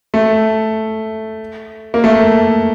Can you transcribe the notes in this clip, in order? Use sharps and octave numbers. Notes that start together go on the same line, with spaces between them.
A3
A#3
A3